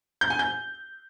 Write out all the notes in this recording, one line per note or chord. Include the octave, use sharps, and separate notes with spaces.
G6
G#5
G6